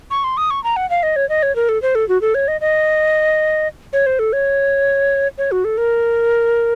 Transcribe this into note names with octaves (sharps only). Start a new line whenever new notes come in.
C#6
C6
D#6
C#6
A#5
F#5
F5
D#5
C#5
D#5
C#5
A#4
A4
C5
A4
F#4
A4
C#5
D#5
D#5
C#5
C5
A4
C#5
C#5
F#4
A4
A#4